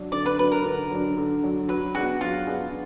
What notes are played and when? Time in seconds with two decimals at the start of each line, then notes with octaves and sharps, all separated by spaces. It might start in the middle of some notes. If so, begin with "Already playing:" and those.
Already playing: F#3 D4
0.12 D3 D5
0.26 B4
0.39 F#3 D4 B4
0.52 A#4
0.64 D3
0.91 F#3 D4
1.17 D3
1.43 F#3 D4
1.68 F#3 B4
1.95 B3 D4 F#4 G#4
2.21 F#3 F4
2.47 B3 D4 G#4